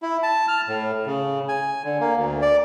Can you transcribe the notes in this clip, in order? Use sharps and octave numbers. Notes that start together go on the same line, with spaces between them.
E4
A5
F6
A2
C#3
G#5
D3
A#3
D2
D5